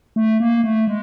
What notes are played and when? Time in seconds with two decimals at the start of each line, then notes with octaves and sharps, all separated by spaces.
0.16 A3
0.40 A#3
0.64 A3
0.87 G#3